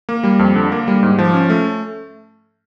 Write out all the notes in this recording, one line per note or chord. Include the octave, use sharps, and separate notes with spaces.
A#3
G3
F2
D3
A#3
G3
G#2
F3
C#4
A3